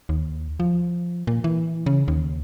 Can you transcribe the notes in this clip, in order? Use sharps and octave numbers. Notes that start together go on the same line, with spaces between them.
D#2
F3
A#2
E3
C#3
D#2